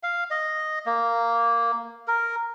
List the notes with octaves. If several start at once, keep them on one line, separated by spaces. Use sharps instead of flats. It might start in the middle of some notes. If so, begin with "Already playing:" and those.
F5
D#5
A#3
A#4